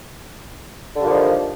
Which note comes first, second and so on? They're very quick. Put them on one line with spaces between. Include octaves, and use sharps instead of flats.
D3 G2 A#2 F3 D#3